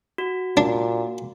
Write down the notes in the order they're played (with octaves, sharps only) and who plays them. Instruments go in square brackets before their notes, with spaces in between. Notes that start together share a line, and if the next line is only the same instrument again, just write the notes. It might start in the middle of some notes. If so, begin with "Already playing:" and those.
[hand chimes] F#4
[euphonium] A#2 [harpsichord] D4